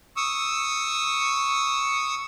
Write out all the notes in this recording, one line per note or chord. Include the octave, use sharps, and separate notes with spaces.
C#6 D#6 E6